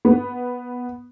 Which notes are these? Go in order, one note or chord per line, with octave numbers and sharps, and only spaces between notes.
B3